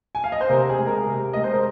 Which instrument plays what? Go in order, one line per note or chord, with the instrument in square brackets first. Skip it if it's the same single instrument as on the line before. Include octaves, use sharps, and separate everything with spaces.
[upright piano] G#5
F5
D#5
C5
C3 A#4
G#4
G#3
A#4
C3
G#3 D#5
C5
A#4